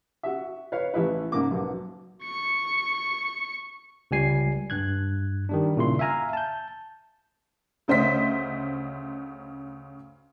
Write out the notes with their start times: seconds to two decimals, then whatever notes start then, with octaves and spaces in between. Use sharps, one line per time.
0.23 F#4 E5
0.72 B4 C#5 F5
0.94 A1 E4 B4
1.32 G#2 C#3 A#3 D6
1.51 B1 F#3
2.24 C#6 C#7
4.11 C#2 G3 G#5 C7
4.70 G2 F#6 G#6
5.49 D#3 G3 D4
5.77 A#2 C#3 E4 C6
5.99 E5 F5 G#5 A#5 F6
6.33 A5 G6
7.88 D2 C#3 C5 D#5 E5 B6